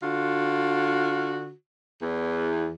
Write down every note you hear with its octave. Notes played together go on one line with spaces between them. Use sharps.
D3 F4 F#4
E2